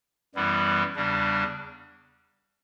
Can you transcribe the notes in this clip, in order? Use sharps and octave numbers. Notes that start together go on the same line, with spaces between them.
F#2 E3 G3 B3 E4
E2 C#3 G3 D4